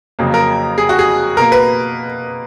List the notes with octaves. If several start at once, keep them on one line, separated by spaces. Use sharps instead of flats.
F2 C#3 F#3 A#3
A#4
G#4
F#4
G#4
B2 A#3 A#4
B4